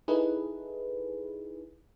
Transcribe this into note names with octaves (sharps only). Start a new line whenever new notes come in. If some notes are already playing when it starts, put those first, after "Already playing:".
D#4 E4 G#4 A4 B4